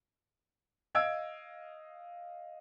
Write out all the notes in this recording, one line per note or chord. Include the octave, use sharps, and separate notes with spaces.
D#5 F5 E6 G#6 D7